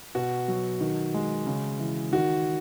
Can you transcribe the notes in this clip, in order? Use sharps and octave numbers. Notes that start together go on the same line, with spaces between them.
B2 F#4
F#3
D#3
G#3
C#3
E3
D#3 F#4